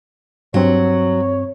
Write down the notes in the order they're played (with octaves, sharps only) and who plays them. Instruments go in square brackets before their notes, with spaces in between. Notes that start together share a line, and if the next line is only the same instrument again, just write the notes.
[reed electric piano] G2 C4 [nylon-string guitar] F#3 [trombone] C#5